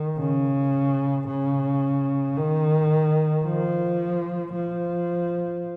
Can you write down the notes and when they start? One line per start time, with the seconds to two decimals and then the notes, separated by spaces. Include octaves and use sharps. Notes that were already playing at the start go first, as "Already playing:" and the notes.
Already playing: D#3
0.19 C#3
1.27 C#3
2.37 D#3
3.45 F3
4.53 F3